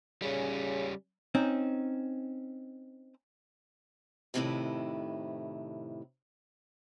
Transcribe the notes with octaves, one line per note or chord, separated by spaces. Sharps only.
C#3 G3 C#4
C4 C#4 D#4
F2 A2 C3 D#3 E4 B4